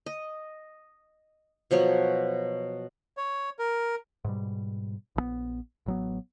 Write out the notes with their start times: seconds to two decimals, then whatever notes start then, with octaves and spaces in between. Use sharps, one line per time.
0.06 D#5
1.71 B2 F3 F#3 C#5
3.17 C#5
3.59 A#4
4.24 G#2 B2 G3
5.16 A#1 C#3 B3
5.86 A1 F#3 B3